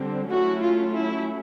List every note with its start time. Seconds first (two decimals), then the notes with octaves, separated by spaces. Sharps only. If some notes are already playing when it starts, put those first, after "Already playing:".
Already playing: D3 G3 C4
0.30 F#3 A3 C#4 E4 F#4
0.61 F4
0.93 E4